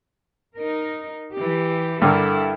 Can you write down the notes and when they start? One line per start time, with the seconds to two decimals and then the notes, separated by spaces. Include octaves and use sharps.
0.56 D#4 A#4
1.34 E3 G4
2.02 G2 D3 E4 A4 A#4